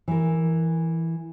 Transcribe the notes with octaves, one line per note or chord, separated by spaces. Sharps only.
E3 A#4